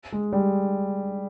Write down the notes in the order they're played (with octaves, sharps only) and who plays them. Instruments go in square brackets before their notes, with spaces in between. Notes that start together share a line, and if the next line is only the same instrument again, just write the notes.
[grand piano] G#3
G3